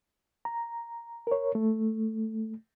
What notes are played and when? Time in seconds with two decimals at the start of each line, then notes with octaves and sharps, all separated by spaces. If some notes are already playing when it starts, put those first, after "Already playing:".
0.45 A#5
1.27 A#4 C#5
1.55 A3